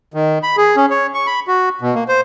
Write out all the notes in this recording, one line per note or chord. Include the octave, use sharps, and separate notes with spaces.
D#3
B5
G#4
C#4
C#5
C#6
B5
F#4
B2
A#3
C5